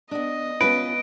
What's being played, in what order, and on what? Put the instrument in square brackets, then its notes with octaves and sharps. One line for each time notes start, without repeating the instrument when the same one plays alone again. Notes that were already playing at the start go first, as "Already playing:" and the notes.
[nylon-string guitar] B3 D4 [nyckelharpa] D#5
[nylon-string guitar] B3 C#4 F4 [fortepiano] B4 [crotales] D7